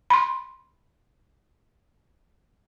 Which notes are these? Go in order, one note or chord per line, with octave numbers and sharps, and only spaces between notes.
B5 C6